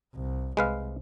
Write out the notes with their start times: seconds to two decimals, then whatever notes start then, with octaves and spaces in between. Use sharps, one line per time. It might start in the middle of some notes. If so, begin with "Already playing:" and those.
0.14 C2
0.57 C2 G#3 B4 F5